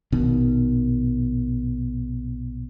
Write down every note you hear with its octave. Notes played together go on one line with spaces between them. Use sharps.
A#1 B2 D#3